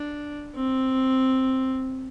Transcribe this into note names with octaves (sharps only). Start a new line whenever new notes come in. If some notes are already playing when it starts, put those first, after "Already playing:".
Already playing: D4
C4